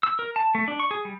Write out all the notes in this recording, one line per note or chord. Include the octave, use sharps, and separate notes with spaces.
E6
A#4
A5
A3
D4
C#6
G#4
G3